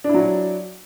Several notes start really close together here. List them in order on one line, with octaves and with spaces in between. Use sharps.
D4 E4 F#3